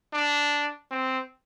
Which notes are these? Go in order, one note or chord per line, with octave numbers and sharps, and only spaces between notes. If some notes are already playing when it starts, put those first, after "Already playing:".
D4
C4